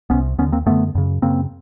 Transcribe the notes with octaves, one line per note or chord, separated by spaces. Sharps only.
C2 C3 B3 C#4
D#2 D3 B3 C#4
A#3 C4
F#2 D3 A3 B3
F#2 C#3
F#2 C#3 A#3 C4